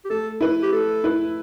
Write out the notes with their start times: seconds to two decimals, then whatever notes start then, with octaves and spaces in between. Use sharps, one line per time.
0.05 G4
0.10 A3 A4
0.41 E4 B4
0.63 G4
0.72 A3 A4
1.04 E4 B4